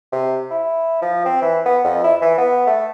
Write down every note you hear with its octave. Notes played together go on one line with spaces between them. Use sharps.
C3
E4
F3
C4
E3
B3
F2
E4
E3
B3
A3